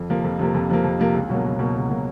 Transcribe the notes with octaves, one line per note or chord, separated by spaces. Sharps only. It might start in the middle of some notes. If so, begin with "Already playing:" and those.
Already playing: F2
C3 F3 A#3
F2
C3 F3 A#3
F2
C3 F3 A#3
F2
C3 F3 A#3
C#2
B2 F#3 A#3
C#2
B2 F#3 A#3
C#2
B2 F#3 A#3